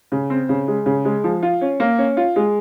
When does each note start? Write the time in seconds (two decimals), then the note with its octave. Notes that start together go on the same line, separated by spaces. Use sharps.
0.12 C#3
0.30 C4
0.49 C#3
0.68 G#3
0.86 C#3
1.05 G#3
1.24 F3
1.43 F4
1.61 C#4
1.80 A#3
1.98 C#4
2.17 F4
2.36 G#3